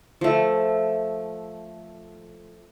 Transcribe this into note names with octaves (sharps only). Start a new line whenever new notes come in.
F3 A3